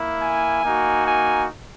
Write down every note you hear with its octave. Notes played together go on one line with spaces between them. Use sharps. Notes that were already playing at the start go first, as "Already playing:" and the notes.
Already playing: A#3 E4
G#5
A#3 D#4 F#4
G#5